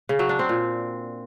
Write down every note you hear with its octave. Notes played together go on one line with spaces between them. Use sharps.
C#3
F#3
D4
C4
A#2